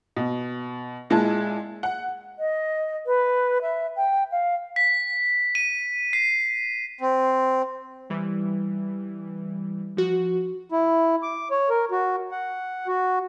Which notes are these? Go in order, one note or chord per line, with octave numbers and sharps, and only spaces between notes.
B2
A#2 G#3 E4 A5
F#5
D#5
B4
E5
G5
F5
B6
D#7
C7
C4
E3 G3
F3 F#4
E4
D6
C#5
A#4
F#4
F#5
F#4